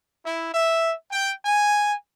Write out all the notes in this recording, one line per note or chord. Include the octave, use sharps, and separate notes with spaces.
E4
E5
G5
G#5